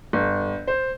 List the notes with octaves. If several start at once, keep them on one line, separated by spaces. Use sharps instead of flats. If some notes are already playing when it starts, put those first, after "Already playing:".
G1
C5